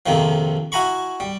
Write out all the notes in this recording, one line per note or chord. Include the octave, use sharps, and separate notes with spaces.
A#1 F2 C3 D#3 F3
E4 F#4 G#5 A#5 B5 C#6
G3